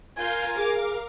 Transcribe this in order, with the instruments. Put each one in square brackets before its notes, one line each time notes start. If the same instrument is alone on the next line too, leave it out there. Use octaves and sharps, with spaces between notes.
[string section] F4 G6 [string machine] A#4 F5 [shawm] G#5
[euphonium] G#4 [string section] D6